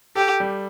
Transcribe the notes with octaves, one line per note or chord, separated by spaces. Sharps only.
G4 A4
G3